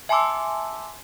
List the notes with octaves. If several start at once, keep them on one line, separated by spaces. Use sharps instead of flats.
E5 G#5 A5 C6 D6 E6